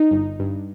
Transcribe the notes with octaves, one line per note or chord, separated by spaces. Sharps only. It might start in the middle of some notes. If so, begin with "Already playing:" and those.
Already playing: D#4
G1
G2